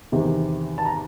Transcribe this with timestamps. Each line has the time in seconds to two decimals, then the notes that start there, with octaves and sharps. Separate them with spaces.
0.12 E2 C3 D#3
0.78 A5
0.85 A#5